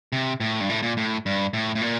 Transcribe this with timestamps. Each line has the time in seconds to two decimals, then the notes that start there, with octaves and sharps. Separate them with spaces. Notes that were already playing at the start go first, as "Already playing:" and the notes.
0.13 C3
0.40 A2
0.60 G2
0.69 A2
0.82 A#2
0.97 A2
1.26 G2
1.53 A2
1.75 A2
1.81 A#2